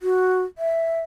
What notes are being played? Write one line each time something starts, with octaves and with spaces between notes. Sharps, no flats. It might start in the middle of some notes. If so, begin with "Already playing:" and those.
F#4
E5